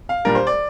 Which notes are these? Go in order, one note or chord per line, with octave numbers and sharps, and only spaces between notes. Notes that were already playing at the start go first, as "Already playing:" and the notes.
F5
A#2 G3 D4 A#4
C5
D5